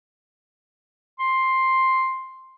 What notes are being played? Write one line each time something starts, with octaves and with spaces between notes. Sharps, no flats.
C6